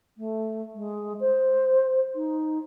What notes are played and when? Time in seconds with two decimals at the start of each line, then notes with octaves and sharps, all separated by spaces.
0.17 A3
0.74 G#3
1.20 C5
2.15 D#4